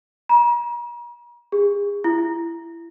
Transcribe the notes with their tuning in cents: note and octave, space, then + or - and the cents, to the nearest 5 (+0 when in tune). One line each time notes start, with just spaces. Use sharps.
A#5 +45
G#4 -40
E4 +25